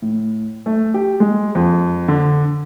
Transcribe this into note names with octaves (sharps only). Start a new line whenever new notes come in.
A2
A3
G4
G#3
F2
D3